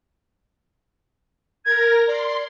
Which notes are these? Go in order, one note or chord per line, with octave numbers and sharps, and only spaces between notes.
A#4 G#6 A#6
D5 C6